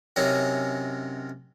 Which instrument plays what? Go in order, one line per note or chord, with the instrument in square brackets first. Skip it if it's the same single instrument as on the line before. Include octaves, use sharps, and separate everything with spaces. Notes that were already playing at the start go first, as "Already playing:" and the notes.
[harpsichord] F#2 C3 C#4 D#4